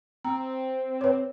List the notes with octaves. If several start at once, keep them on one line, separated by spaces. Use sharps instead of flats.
C4 A#5
B4 C#5